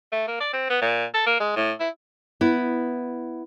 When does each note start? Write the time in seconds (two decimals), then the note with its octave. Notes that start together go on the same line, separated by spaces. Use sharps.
0.12 A3
0.28 A#3
0.41 D5
0.53 C4
0.70 B3
0.82 A#2
1.14 A4
1.26 A#3
1.40 G#3
1.56 A2
1.80 E4
2.41 B3 E4